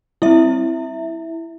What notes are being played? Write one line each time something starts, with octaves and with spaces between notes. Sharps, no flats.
G3 C4 E4 E5